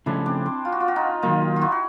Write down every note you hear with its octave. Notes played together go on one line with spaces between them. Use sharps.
C#3 F3 A3 C#4 D4 E4
C4 D4
C4
F4
F#4
F4
F#4
D#4 F4
D#3 F#3 A#3 D#4 F4
F4
E4 F#4
F#4